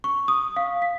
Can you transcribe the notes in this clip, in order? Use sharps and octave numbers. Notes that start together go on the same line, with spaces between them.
C#6
D#6
F5
B6